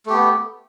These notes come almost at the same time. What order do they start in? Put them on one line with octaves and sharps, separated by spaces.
A3 G4 B3